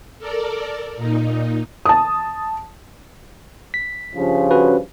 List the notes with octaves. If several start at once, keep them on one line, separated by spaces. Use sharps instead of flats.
A4 A#4 D5
A#2 D#4
A5 D#6
B6
G2 C#3 F3
C#4 F#4 B4